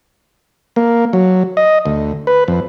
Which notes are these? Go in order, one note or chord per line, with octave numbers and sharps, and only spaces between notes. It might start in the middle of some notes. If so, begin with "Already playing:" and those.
A#3
F#3
D#5
D2
B4
F2